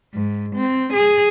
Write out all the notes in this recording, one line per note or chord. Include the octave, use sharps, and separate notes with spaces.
G#2
C4
G#4